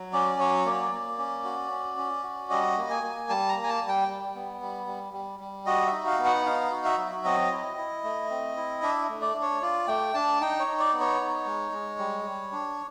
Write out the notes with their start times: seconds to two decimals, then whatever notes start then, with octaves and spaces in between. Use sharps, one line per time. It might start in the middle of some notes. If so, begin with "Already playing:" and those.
Already playing: F#3
0.13 C#4 D5
0.39 F#3 C#5
0.65 A#3 D5
0.92 A#3
1.18 C#4
1.44 F#4
1.71 C#4
1.97 C#4
2.23 F#4
2.50 G3 D#5
2.77 A#3
2.90 G#5
3.03 A#3
3.29 G3 A5
3.49 A#5
3.56 A#3
3.63 G#5
3.69 A5
3.82 G3
3.88 G5
4.08 G3
4.35 B3
4.61 G3
4.87 G3
5.13 G3
5.40 G3
5.66 F#4 D#5
5.86 E5
5.92 D#4
6.07 F5
6.19 B3
6.26 F#5
6.46 D#4 F5
6.71 F#4
6.85 E5
6.98 F#3
7.24 C4 D#5
7.51 E4
7.77 E4
8.04 A3
8.31 C4
8.57 E4
8.82 D4 E5
9.09 A3
9.22 D5
9.35 D4
9.42 C#5
9.62 F4 D5
9.88 A3 G5
10.14 D4 A5
10.41 D#4 G5
10.60 C#5
10.67 D#4
10.80 D5
10.93 B3
11.00 C#5
11.20 D#4
11.46 G#3
11.72 G#3
11.98 G3
12.25 G3
12.52 D4